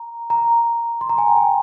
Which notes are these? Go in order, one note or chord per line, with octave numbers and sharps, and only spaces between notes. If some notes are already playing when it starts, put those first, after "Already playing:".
Already playing: A#5
A#5
C6
A#5
G#5
G5
G#5